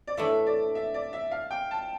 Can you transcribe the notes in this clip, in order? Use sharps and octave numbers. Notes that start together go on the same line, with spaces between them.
D5
A2 E3 A3 D4 E5
D5
E5
D5
E5
F5
G5
A5